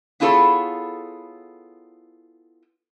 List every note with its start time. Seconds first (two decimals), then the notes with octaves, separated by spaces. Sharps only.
0.20 B3 E4 F4 G#4 A4 C#5